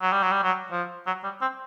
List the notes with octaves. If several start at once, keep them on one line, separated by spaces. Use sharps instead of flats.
F#3
G3
F#3
G3
F#3
F3
F#3
G3
C4